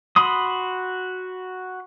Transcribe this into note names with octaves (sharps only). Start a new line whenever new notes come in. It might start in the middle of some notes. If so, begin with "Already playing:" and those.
F#4 B5 C6 D#6